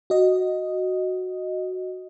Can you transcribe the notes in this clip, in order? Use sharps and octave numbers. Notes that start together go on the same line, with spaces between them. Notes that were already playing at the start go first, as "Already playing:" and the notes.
F#4 D#5